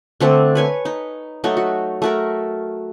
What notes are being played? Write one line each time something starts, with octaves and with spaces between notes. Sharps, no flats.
D3 A3 C4 D4
B4 C#5 G#5
D#4
F#3 A3 D#4 F#4
F#4
A3 F#4 A#4